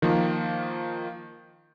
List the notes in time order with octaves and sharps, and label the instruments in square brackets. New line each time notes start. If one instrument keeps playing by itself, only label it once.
[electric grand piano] D#3 F3 A#3